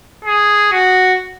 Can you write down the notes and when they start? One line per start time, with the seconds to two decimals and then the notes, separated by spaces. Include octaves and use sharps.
0.25 G#4
0.72 F#4